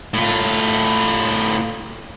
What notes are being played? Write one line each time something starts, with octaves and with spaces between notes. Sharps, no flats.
A2 F4